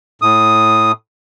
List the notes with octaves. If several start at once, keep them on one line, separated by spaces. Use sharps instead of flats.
A2 D#6